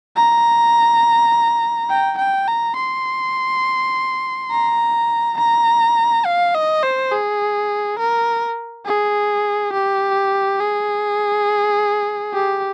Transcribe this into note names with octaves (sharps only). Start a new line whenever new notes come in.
A#5
G5
G5
A#5
C6
A#5
A#5
F5
D#5
C5
G#4
A#4
G#4
G4
G#4
G4